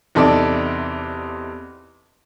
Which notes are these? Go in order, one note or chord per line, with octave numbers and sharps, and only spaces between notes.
E2 C3 D#4 A4 D5